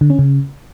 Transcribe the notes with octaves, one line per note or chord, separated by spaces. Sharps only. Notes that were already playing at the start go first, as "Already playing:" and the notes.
D3
C#4
C#3